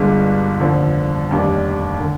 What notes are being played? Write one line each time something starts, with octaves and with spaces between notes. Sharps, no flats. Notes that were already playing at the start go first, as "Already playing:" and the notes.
Already playing: G1 G2 D3 G#3 D4
F1 D#2 D3 F3
F1 D#2 D#3 G3 D4
D3